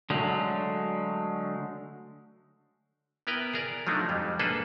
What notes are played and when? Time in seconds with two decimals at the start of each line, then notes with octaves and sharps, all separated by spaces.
0.10 D3 F#3 G#3 A3
3.27 B3 E4 A#4 B4 G5
3.53 G#4 A#4 D5
3.87 F3 F#3 A3 D4 D#4
4.09 F2 G3 G#3
4.39 A#3 D4 G#4 A4 B4 C5